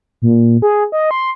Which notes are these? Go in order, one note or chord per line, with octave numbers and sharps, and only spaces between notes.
A#2
G#4
D#5
C6